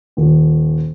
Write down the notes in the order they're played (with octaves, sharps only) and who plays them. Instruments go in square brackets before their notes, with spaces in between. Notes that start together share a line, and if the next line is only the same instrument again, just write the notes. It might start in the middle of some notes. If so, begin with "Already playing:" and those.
[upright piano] D#1